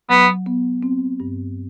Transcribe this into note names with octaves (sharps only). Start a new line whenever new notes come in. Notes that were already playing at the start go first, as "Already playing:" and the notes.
F#3 B3
B3
C4
G2